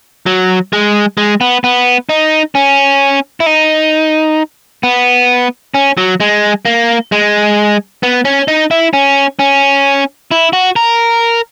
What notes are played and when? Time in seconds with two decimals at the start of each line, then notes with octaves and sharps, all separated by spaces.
0.26 F#3
0.73 G#3
1.17 G#3
1.41 B3
1.64 B3
2.09 D#4
2.55 C#4
3.40 E4
3.46 D#4
4.83 B3
5.74 C#4
5.97 F#3
6.20 G#3
6.65 A#3
7.12 G#3
8.03 B3
8.25 C#4
8.48 D#4
8.71 E4
8.93 C#4
9.39 C#4
10.31 E4
10.53 F#4
10.76 A#4